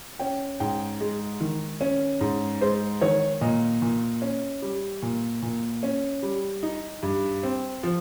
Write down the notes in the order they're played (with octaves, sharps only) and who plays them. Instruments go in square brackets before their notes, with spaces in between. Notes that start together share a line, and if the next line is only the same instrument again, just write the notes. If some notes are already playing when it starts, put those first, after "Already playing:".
[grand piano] C#4 G5
G#2 G5
G#3
D#3
C#4
G#2
G#3 C5
D#3 C#5
A#2 D#5
A#2
C#4
G3
A#2
A#2
C#4
G3
D#4
G2
C4
F3